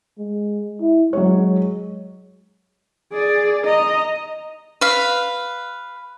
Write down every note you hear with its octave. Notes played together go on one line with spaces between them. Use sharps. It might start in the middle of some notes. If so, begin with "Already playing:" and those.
G#3
E4
F#3 G#3 C#5
G#4 D5
D#5 A#5
B4 F5